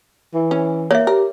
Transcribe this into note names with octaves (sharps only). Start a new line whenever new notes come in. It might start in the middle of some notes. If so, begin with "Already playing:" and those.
E3
C#4
A#3 C#5 E5
G4 A#4